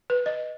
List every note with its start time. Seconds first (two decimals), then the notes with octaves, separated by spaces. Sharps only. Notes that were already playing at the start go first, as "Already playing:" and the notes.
0.10 B4
0.26 D#5